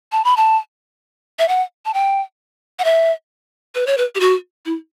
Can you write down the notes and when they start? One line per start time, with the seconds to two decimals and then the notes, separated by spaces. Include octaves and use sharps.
0.12 A5
0.25 B5
0.37 A5
1.39 E5
1.48 F#5
1.85 A5
1.94 G5
2.79 F#5
2.84 E5
3.75 B4
3.87 C#5
3.98 B4
4.15 G4
4.20 F#4
4.66 E4